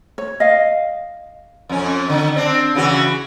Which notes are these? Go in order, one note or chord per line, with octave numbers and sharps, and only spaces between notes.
C#5
D#5 F5
F2 C#4
D3
C4 D4
C#3 E3 F#4